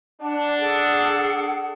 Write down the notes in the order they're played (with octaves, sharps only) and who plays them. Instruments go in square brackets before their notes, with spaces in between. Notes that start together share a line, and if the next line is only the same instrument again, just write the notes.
[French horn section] D4 [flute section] F#5 A5
[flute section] G#4 A4 F#5